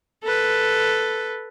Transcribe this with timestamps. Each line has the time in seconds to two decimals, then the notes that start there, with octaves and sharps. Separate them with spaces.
0.24 A4 B4